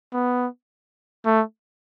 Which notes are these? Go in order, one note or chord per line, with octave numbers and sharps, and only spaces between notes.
B3
A3